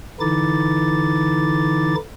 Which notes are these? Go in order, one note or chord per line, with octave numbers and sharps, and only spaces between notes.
D3 E3 D#4 E4 D6 A6